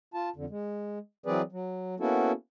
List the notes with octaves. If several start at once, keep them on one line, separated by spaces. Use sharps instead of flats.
F4 A5
F2 D3
G#3
E3 F#3 C4 G#4 B4 D5
F#3
A#3 B3 C#4 E4 F#4 A4